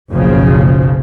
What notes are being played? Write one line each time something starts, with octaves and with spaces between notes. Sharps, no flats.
F#1 B1 C#3 F3